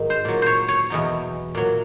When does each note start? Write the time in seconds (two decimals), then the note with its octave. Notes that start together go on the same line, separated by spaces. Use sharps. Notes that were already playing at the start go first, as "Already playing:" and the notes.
Already playing: G#2 D#3 F#3
0.10 C5
0.25 A#2 F#3
0.42 C5 C#5
0.68 C#5
0.90 E2 B2 F#3
1.55 A#2 F#3